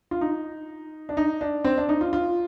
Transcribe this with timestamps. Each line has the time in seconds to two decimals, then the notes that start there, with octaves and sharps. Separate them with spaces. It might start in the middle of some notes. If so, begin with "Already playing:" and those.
0.11 F4
0.21 D#4
1.09 D4
1.17 D#4
1.41 D4
1.64 C4
1.77 D4
1.89 D#4
2.01 F4
2.13 F4